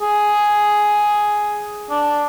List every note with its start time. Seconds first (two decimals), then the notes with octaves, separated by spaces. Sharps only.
0.01 G#4
1.90 D4